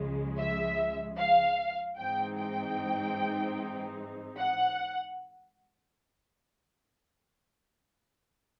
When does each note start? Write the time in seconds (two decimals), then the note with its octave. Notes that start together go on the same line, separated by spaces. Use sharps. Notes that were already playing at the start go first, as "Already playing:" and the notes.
Already playing: C#2 C#3 F3 G#3
0.38 E5
1.18 F5
1.97 G#2 E3 G#3 C4 D#4 G5
2.37 G5
4.38 F#5